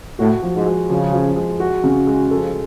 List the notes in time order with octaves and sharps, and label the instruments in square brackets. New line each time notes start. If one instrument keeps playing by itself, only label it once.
[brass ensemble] A2 [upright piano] F#4
[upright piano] F3
[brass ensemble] G#2
[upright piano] G#3
[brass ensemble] C#3 [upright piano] F3
[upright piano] F3
G#3
F#4
C#3
G#3
[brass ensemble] F3 [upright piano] A4